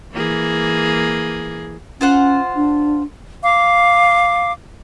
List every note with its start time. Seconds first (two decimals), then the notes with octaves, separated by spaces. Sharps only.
0.13 E3 A#3 G#4
2.01 C#4 F4 C5 F#5
2.56 D4
3.43 F5 D6